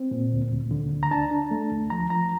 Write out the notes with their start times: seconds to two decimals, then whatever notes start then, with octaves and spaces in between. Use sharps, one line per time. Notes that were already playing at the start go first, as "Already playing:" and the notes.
Already playing: C4
0.11 A#2
0.32 D2
0.51 D2
0.71 D3
0.92 D2
1.03 A#5
1.11 D4 A5
1.31 D4
1.51 A3
1.71 D2
1.90 F3 A#5
2.10 F3 A#5